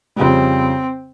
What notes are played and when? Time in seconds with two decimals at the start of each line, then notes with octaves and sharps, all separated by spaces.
0.16 F2 C#3 G3 C4